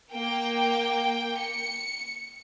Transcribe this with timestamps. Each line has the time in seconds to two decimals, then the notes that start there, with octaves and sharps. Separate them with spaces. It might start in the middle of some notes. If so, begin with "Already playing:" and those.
0.13 A#3 G5
1.38 C#7